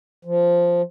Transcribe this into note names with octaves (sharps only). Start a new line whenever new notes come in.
F3